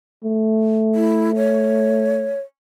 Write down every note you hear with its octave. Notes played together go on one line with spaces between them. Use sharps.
A3
E4
C#5